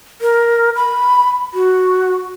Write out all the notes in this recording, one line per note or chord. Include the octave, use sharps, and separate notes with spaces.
A#4
B5
F#4